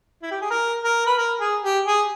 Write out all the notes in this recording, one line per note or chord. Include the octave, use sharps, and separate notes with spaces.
E4
G4
G#4
A#4
A#4
B4
A#4
G#4
G4
G#4